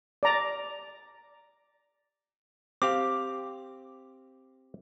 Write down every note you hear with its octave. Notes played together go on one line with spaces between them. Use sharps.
D5 A#5
C4 G4 F5 D6